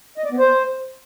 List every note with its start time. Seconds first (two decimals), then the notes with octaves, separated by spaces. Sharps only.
0.18 D#5
0.25 D5
0.32 B3
0.38 C5